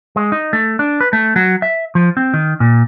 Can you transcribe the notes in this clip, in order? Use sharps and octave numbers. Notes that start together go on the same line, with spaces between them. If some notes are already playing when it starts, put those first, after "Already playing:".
G#3
D#4
A3
D4
B4
A3
F#3
E5
F3
C4
D#3
A#2